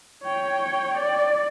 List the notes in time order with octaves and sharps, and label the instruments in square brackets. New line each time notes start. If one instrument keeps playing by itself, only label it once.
[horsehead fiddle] C#5 G5
D5